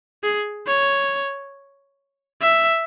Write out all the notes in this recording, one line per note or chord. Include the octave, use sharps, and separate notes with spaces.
G#4
C#5
E5